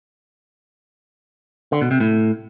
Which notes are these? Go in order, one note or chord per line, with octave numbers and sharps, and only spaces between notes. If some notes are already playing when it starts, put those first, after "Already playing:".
D3
B2
C3
A2